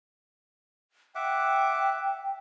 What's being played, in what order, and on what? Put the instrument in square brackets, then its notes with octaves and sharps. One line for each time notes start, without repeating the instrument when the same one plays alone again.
[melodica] E5 F#5 D6 [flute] G5